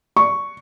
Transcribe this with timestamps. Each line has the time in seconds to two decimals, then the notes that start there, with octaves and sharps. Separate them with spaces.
0.17 C#6